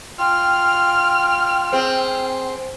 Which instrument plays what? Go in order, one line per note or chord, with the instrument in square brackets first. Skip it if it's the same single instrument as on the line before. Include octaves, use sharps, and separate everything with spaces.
[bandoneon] F4 [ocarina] G5 [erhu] F6
[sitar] C4 G#4